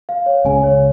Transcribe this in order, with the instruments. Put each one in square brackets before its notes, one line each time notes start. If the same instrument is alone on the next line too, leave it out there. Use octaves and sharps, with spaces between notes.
[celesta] F5
C#5
[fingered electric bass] C#2 C#3 [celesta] G#5
[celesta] C#5